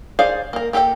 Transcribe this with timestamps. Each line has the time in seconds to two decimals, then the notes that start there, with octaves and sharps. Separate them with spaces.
0.19 D#4 G#4 C5 D5 F5
0.53 A#3 A#4
0.73 A#3 G4 A4 B4 G5